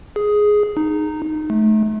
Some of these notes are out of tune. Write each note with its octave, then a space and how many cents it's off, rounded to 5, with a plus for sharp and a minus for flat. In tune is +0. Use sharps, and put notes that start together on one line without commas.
G#4 +5
D#4 -15
A3 -30